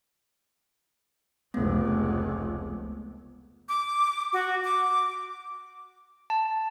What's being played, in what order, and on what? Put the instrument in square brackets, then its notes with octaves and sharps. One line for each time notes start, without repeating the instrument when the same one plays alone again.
[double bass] F1 C#2 [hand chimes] A3 B3
[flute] D6
F#4
D6
[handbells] A5